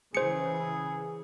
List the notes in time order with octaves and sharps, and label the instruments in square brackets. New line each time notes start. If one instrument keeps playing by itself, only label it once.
[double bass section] C#3 E3 [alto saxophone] G#4 [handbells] C5 C#7